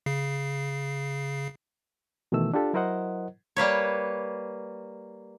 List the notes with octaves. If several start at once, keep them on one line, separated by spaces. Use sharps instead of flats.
C#3 C7
B2 D#3 E3 A3 E6
D4 F4 G4 A4
F#3 E4 A#4 C5 D#5 F#5
G3 A#3 B4 C#5